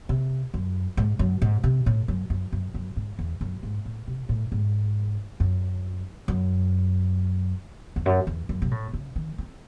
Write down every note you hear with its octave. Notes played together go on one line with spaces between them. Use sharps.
C3
F#2
G#2
F#2
G#2
C3
A2
F#2
F#2
F#2
F#2
G#2
E2
F#2
G#2
A2
C3
A2
G#2
F#2
F#2
E2
F#2
E2
F#2
C3
A2
C#3
D#3
C4